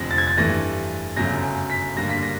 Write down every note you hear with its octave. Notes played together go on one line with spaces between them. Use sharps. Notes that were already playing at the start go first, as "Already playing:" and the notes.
Already playing: F1 F2 D3 A#6
A6
G#6
A6
G2 E3 A3 A#6
G1 F#2 C#3 F#3 A3 A#6
B6
G2 D3 G3 A#3 A#6
B6
A#6